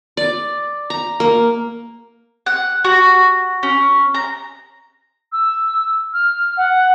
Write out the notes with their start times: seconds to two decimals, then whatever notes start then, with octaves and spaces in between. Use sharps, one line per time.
0.17 D5
0.90 A#5
1.20 A#3
2.46 F#5
2.84 F#4
3.63 C#4
4.14 A#5
5.32 E6
6.13 F6
6.57 F#5